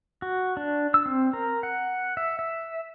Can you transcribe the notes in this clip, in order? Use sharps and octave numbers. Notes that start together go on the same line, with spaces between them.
F#4
D4
E6
C4
A#4
F#5
E5
E5